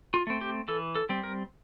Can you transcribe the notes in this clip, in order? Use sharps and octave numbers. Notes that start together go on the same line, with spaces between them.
F4
A3 C4
G4
E3 A4
A4
G3 C4
A#4